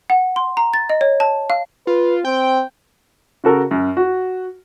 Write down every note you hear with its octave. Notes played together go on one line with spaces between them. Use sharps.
F#5
C6
A#5
A6
D#5
C#5
A5
F5
F4 B4
C4 G5
C#3 F#4 A4 A#4
F#2
F#4